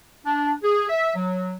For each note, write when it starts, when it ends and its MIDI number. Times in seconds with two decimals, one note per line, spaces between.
0.25 0.53 62
0.63 0.85 68
0.89 1.11 76
1.16 1.55 54